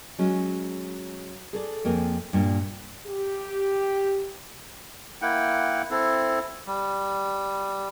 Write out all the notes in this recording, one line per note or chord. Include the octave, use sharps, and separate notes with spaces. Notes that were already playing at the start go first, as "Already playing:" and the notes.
F#3 G#3 C#4
G#4 A4 D5
F2 A#3 C4 G#4
G2 A#2
G4
A#3 E4 F#5 G5
C4 E4 A4
G3